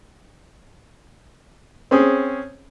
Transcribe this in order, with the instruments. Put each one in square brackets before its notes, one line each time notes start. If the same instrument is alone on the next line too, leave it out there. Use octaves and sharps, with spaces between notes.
[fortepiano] C4 C#4 G#4